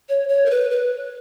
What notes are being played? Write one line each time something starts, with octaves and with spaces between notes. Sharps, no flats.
C#5
C#5
A#4
B4
B4